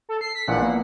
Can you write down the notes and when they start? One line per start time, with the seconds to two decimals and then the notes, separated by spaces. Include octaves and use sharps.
0.09 A4
0.21 C7
0.35 B6
0.48 A#1 A#2 E3 F#5
0.62 A#3 B3